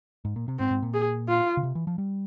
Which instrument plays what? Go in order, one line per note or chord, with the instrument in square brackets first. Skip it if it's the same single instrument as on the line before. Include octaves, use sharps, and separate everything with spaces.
[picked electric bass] G#2
A#2
C3
[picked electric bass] G#2 [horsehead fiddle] C4
[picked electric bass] G#2
A#2
[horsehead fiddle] G#4
F4
[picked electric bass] C#3
C3
E3
F3
G3